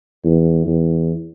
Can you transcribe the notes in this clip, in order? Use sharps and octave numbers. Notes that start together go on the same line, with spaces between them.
E2
E2